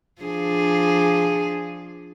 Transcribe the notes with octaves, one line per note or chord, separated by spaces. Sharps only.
F3 D4 G#4